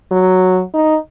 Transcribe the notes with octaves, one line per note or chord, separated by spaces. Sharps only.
F#3
D#4